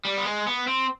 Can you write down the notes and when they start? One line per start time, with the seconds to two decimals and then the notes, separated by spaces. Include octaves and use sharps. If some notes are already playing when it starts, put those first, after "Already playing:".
0.05 G3
0.17 B3
0.25 G#3
0.47 B3
0.67 C4